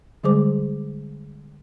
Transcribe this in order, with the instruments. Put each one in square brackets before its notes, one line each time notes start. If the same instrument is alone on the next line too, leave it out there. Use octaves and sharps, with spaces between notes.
[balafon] D3 G3 G#3 G#4 C5 D6